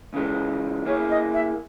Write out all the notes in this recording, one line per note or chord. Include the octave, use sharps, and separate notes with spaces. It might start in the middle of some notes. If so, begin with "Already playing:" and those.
C#3 E3 G#3 C#4
A#3 E4 G#4 C#5
D#5
E5